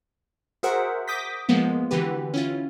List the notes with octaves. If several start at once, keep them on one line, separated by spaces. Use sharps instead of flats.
F#4 G#4 A#4 C5 E5 F#5
D6 D#6 G6 A#6 B6
F3 G#3 A#3 B3
D3 E3 F#4 G4 B4
C#4 E4 F4